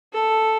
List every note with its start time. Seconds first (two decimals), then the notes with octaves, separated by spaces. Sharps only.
0.13 A4